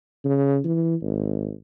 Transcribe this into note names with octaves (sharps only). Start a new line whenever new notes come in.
C#3
E3
G#1